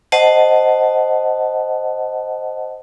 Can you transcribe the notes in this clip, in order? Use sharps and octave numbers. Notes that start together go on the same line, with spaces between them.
C5 D#5 F#5 A5